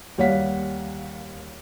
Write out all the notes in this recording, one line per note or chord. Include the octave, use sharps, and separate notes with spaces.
D#2 G3 C#5 F5 F#5 B6